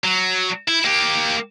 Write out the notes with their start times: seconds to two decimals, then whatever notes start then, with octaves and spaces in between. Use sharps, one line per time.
0.04 F#3
0.68 E4
0.85 A#3 G4